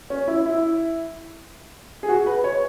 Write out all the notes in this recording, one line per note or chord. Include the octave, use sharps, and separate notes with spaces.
C#4
E4
E4
G#4
F#4
B4
C#5